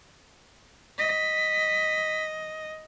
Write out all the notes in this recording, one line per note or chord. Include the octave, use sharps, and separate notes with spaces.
D#5 B6